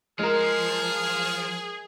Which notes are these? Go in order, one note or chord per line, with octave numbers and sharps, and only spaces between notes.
F3 G#3 G#4 A#4 F6